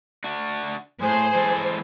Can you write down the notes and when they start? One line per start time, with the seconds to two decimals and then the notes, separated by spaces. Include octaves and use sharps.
0.24 D4 F#4
1.02 A2 G#4 C5
1.35 E3 G#3 A4